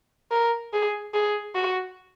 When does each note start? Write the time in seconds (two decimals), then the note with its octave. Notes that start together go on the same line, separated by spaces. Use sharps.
0.31 A#4
0.73 G#4
1.14 G#4
1.55 F#4